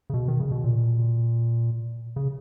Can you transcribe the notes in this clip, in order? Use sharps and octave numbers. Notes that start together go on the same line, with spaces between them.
C#3
B2
D#3
C#3
B2
A#2
C#3